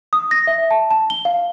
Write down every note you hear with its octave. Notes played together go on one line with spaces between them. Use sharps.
D#6
A#6
E5
A5
A5
G7
F5